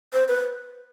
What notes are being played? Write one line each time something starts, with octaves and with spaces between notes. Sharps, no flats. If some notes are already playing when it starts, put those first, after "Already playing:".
C5
B4